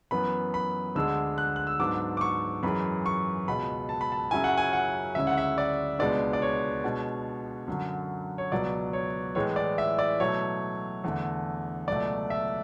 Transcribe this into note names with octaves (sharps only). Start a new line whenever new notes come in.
F#2 E3 B3 B5
B5
D2 D3 G#3 D4 E6
F#6
F#6
E6
G#2 F#3 B3 D4 D6
D6
C#6
F#2 E3 G#3 B5
C#6
C#2 B2 G#3 B5
A5
B5
A5
F#2 C#3 F#3 C#4 E4 G#5
F#5
G#5
F#5
D2 C#3 G#3 C#4 E4 E5
F#5
E5
D5
C#2 B2 G#3 B3 D4 D5
D5
C#5
B2 G#3 D4
F#2 D3 F#3
C#5
C#2 B2 F#3 B3 D5
C#5
A2 E3 G#3 C#5
D5
E5
D5
B2 F#3 A3 E4 C#5
E2 D3 A3
C#2 B2 F#3 A3 D5
E5